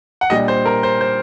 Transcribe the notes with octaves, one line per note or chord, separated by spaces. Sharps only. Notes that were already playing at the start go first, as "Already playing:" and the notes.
F#5
A#2 G3 D4 D#5
C5
A#4
C5
C5